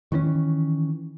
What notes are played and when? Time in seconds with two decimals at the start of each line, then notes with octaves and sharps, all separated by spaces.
0.12 D#3 E3 A#3 C#4